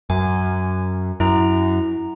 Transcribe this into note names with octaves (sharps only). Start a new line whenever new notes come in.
F#2 G#5
F#2 E4 A#5